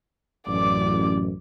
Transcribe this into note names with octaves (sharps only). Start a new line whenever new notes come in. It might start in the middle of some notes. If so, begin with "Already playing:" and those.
A1 F#2 D5 D6